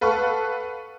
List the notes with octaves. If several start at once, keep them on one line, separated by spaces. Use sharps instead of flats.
A4 B4 F5 F#5 C#6